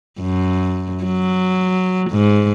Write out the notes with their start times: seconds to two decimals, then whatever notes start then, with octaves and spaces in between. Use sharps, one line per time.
0.20 F#2
1.04 F#3
2.11 G#2